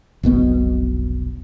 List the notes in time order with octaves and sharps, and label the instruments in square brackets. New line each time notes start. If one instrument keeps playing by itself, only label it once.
[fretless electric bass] F1 B1 B2 B3